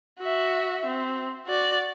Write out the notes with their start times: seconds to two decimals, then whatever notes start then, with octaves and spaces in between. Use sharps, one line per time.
0.20 F#4 E5
0.86 C4
1.48 F#4 D5